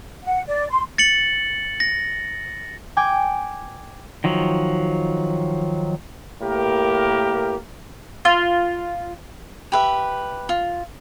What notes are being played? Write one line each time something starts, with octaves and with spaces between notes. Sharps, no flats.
F#5
D5
C6
A6 C#7 F#7
A#6
G5 G#5 D6
D#3 F3 F#3
A2 A#3 G4 A#4
F4
G4 B4 E5
F4